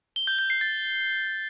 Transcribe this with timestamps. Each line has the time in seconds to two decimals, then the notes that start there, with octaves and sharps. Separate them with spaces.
0.16 G7
0.27 G6
0.39 G6
0.50 C7
0.61 A6